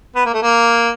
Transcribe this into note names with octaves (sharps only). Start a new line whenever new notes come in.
B3
A#3
A3
A#3